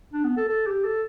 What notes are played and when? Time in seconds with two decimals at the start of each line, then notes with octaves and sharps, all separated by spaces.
0.13 D4
0.25 B3
0.37 A4
0.49 A4
0.67 G4
0.84 A4